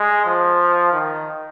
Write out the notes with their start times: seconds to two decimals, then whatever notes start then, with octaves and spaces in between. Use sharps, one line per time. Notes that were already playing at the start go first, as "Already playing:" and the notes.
Already playing: G#3
0.25 F3
0.93 D#3